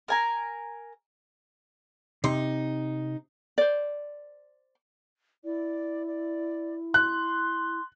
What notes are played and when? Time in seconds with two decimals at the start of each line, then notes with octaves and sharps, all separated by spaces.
0.08 A#4 G#5 A#5
2.24 C3 D#4 C6
3.58 C5 D5
5.45 E4 D5
6.07 D5
6.94 C6 F#6